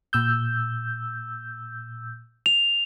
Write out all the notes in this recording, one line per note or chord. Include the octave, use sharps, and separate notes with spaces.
A#2 E6 G6
F7